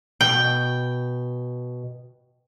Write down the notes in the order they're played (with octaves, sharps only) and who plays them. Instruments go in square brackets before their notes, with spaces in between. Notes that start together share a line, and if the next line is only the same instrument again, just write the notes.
[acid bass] B2 [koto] G5